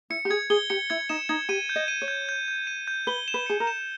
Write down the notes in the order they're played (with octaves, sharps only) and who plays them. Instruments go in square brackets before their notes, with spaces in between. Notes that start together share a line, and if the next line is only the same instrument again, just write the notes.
[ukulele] E4 [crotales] C#7
[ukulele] G4
[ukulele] G#4 [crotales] G#6
[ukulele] G#4 [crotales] G7
[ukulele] G4 [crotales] C#7
[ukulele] E4 [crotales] G#6
[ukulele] D#4 [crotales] E7
[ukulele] D#4 [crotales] G#6
[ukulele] G4 [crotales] D#7
[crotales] G6
[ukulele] D#5
[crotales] D#7
[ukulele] C#5
[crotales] G6
G6
G6
D#7
G6
[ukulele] B4 [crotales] G7
[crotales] E7
[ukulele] B4
[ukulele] G#4 [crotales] C#7
[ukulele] A#4
[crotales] E7